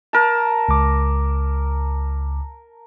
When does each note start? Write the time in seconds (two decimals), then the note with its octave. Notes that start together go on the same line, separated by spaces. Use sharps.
0.13 A#4 A5
0.69 C#2 D6